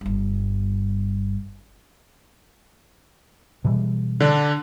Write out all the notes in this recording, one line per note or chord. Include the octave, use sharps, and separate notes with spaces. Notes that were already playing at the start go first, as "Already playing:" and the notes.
G1 G2
B2 E3 G3
D3 D4